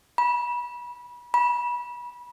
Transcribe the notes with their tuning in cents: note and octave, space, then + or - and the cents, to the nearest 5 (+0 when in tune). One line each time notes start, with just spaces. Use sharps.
B5 -30
B5 -30